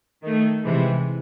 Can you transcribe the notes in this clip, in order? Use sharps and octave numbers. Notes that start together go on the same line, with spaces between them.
D#3 A3
C3 E3 G#3